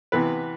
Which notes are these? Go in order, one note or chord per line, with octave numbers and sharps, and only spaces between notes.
C3 E3 B3 B4